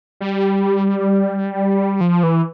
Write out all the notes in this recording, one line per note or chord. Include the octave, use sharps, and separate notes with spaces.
G3
F3
E3